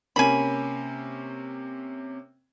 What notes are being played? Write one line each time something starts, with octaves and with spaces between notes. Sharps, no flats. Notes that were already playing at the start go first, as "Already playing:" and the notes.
C3 A#3 C#4 G#5 B5